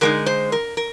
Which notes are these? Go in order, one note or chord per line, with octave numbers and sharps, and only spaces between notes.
D3 G#3 D#4 A#4
C5
A#4
A#4